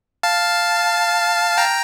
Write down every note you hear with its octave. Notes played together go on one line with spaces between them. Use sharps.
F5 A5
G5 A#5